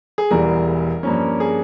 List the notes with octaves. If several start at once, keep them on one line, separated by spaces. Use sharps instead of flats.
G#4
E1 E2 E3 G3 A#4
G2 F3 A#3 C#4
G#4